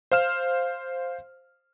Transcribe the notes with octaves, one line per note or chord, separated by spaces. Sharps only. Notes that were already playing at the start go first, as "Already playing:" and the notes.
C5 F5 F6 E7